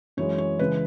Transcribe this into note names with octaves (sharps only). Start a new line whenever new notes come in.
F#2 E3 G#3 C#5
C#5
C#3 E3 G#3 B4